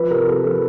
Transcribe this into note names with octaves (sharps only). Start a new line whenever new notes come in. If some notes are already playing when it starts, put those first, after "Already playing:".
Already playing: F3 B4
C3 A#4
C3 A4
F3 A4